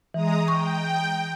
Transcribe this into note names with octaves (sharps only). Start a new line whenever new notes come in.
E3 G#3 A#5 D#6
G5 C#6